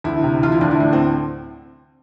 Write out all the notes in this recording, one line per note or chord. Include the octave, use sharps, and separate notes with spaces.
D2 E4
C3
E3 F4
E4
D2 D4
E4
A2 D4
C4